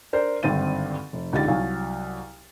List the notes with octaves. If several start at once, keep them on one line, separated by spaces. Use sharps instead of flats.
D4 A#4 C5 D5
G#1 G2 D3 C4 A6 D#7
F1
C#2 D3 D#4 G4 A6
C2 F#3 F#4 F5 G#5